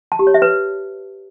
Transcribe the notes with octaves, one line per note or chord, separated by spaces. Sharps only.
A5
G4
C#5
E5
B4